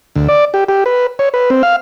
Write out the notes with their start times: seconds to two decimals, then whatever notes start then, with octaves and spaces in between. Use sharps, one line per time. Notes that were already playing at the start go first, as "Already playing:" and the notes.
0.15 D2
0.28 D5
0.54 G4
0.69 G4
0.86 B4
1.19 C#5
1.34 B4
1.50 C4
1.63 F5